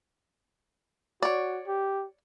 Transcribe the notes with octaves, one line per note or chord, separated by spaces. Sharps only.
F#4 C#5 D5
G4